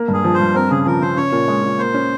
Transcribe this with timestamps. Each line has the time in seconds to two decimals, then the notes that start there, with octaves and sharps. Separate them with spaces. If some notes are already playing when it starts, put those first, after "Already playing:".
Already playing: A#3
0.08 G2
0.14 G#4
0.24 F3
0.34 C5
0.40 G2
0.55 C4 A#4
0.71 C#3 G#4
0.86 F3 A#4
1.02 C#3 C5
1.17 C#4 C#5
1.32 A#2
1.48 G#3
1.63 A#2
1.78 A#3 C5
1.94 C#4